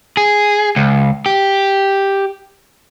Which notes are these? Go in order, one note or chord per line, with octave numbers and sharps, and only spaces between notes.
G#4
C#2
G4